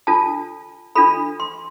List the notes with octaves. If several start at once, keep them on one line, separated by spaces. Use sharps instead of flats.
D4 F4 A4 A5
D4 F4 A4 B5
C6